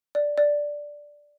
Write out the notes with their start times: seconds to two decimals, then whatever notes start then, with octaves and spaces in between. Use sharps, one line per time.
0.15 D5
0.38 D5